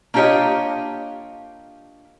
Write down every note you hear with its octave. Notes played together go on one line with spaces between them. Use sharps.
A#3 D4 F4 G4 C#5 D#5